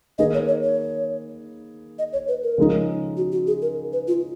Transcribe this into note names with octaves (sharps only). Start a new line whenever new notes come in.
D#3 A#3 D#4 G#4 B4 D#5
C#5
C#5
C#5
D#5
C#5
B4
A#4
C#3 F3 G#3 D#4
F#4
F#4
G#4
A#4
B4
F4